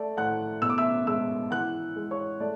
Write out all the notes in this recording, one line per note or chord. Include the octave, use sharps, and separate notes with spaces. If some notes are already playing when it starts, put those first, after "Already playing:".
Already playing: A3 D5
A2 F#5 F#6
B2 E6
D6
E5 E6
G#3 E5 E6
E3 F#5 F#6
G#3
C#5 C#6
A3 D5